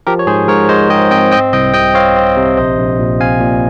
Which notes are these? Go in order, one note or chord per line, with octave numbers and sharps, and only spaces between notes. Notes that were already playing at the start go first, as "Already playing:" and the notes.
F3 G4 A#4
C#5
G#2 G#4 C5
G#2 A#4 C#5
G#2 C5 D#5
G#2 D#5 G5
C4 D#5 G5
C4 D#5 G5
C2 D#5 G5
C3 D#5 G5
C4 C#5 F5
C4
C3
A#1 C5 D#5
A#1
A#2
C4 F5 G#5
A#2